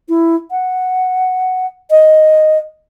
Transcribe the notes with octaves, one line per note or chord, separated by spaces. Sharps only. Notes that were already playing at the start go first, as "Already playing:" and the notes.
E4
F#5
D#5